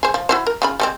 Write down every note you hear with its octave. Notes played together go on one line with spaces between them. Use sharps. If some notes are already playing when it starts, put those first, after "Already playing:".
G#4 C5
F3
E4 F#4 C5
A#4
C#3 F4 B5
G3 G#3 C4